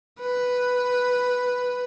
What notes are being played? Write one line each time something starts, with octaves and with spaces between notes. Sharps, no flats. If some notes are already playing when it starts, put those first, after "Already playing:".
B4